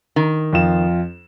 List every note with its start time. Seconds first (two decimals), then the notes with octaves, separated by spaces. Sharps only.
0.16 D#3
0.53 F2 F4 E7